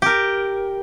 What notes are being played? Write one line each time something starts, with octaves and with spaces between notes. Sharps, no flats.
G4 A#4